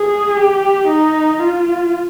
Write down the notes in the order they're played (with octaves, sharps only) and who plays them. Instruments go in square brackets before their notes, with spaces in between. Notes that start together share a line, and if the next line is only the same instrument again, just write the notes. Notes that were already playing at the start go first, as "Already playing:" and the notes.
Already playing: [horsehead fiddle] G#4
G4
D#4
F4